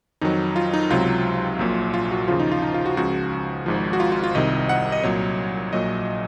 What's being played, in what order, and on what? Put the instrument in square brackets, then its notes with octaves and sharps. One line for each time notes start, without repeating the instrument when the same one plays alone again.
[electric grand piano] F2 D#3 F#3 D#4
F4
D#4
C#2 C3 F#3 F4
A#1 A#2 F#3
F4
F#4
D#2 C#3 F3 F4
D#4
F4
D#4
F4
F#4
C#2 C#3 F3 F#4
G#1 G#2 F3
F#4
F4
F4
F4
C2 C3 D#3 D#5
F#5
D#5
C2 A#2 F#3 C#5
A#1 A#2 F#3 D#5